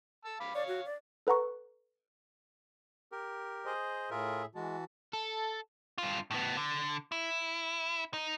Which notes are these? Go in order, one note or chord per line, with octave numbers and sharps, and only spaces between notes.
A5 E6
F5 B5 D6
C#5 D5 F5
F#4
D5
A4 B4 F#5 A#5 C#6
G4 A#4
G#4 C5 D#5
A2 F4 G#4 A#4 E5
E3 G#3 F#4 A5
A4
G2 F4
A2 B3
D3
E4
D#4